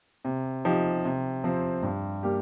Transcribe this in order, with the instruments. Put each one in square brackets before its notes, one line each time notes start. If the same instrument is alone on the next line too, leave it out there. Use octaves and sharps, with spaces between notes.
[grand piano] C3
F3 D#4 G4
C3
F3 C4
G2
G3 A#3 G4